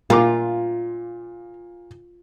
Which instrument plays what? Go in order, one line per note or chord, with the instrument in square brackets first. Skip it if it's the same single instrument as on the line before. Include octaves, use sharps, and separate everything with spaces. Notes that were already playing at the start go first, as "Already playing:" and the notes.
[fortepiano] A#2 D6 [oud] F4